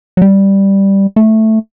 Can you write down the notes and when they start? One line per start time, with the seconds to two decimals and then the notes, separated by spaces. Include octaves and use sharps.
0.17 F#3
0.22 G3
1.16 A3